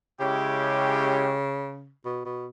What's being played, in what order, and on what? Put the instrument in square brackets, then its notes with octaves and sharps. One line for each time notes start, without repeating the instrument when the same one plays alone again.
[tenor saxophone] C#3 [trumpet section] G#3 C#4 E4 G4
[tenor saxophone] B2
B2